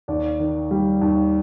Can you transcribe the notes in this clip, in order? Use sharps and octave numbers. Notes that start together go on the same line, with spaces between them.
D#2 D5
D#3
G3
D#2